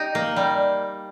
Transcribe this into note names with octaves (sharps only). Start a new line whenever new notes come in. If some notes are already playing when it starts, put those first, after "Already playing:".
Already playing: D#4 G4
A#3
G3